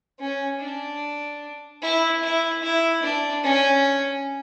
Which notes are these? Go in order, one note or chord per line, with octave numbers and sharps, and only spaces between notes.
C#4
D4
E4
E4
E4
D4
C#4